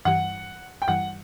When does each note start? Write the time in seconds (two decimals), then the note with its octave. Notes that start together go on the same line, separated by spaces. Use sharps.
0.05 G2 E3 G3 F#5
0.82 G5
0.88 G2 E3 G3 F#5